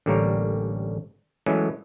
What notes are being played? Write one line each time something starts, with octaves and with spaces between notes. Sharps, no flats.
A1 D3 G3 A#3 A#4 C#5
E3 F#3 G#3 A3 C#4